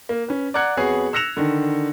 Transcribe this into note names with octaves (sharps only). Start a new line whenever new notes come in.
A#3
C#4 B4
D5 F#5 A#5 F#6 G#6 C#7
F2 B3 F#4 G#4 C#5 C7
E6 F#6 A#6 C#7 E7 F7
D3 D#3